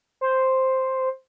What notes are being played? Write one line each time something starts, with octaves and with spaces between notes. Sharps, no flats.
C5